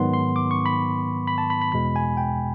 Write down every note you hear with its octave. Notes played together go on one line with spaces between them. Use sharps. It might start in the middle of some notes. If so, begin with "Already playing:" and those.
Already playing: G#2 D#3 F#3 B3 C6
C6
D6
C#6
B5
B5
A5
B5
B5
E2 B2 G#3 B5
G#5
G5